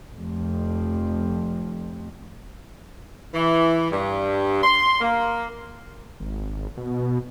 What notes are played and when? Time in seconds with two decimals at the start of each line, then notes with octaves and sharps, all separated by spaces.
0.16 F1 F2
3.34 E3
3.91 G2
4.64 C6
5.01 A#3
6.20 G#1
6.77 B2